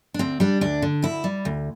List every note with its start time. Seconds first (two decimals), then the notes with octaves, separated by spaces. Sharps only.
0.14 D4
0.19 D2 C4
0.40 G3 D4
0.61 D2 D4
0.82 D3
1.03 D2 E4
1.24 G3
1.45 D2